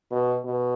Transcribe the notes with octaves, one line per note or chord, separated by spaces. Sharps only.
B2
B2